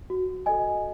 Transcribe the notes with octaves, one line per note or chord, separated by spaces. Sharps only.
F#4
A4 D#5 G#5